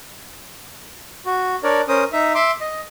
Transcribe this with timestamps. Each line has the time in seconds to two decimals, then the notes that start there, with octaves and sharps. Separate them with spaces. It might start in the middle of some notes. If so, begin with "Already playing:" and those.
1.26 F#4
1.63 D4 A#4 C#5 D5
1.88 C#4 A#4 C5 D#6
2.12 D#4 E5
2.35 E5 C6 D6
2.61 D#5